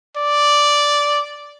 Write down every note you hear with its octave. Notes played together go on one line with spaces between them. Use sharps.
D5